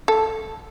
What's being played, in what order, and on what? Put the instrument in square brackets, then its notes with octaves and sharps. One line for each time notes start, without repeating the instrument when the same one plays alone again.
[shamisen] A4